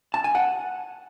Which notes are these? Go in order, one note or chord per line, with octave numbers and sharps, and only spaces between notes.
A5
G#5
F#5